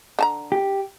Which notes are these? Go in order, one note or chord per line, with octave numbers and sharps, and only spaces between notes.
D3 A5 A#5
G4